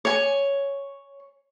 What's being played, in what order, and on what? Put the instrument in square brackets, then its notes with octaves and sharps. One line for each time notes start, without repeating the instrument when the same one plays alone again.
[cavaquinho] C#5 G#5